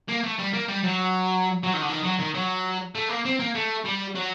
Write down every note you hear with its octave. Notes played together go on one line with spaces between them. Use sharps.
A#3
A3
G3
A#3
G3
F#3
F#3
D#3
D3
D#3
F#3
D#3
F#3
A3
A#3
C4
A#3
A3
G3
F#3